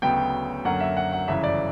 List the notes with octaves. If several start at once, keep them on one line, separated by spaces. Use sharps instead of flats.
D2 C#3 F#3 B3 G5
F#2 D3 F#3 A#3 F#5
E5
F#5
F#5
G1 F#2 C#3 E3 E5
D5